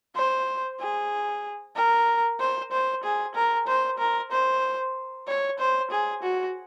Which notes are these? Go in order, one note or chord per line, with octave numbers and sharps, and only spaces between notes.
C5
G#4
A#4
C5
C5
G#4
A#4
C5
A#4
C5
C#5
C5
G#4
F#4